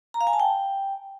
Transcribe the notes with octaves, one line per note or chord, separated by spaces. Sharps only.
A#5
F5
G#5
A5
G5